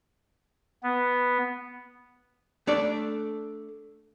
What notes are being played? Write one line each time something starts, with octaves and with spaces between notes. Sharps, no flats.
B3
A3 D4 D5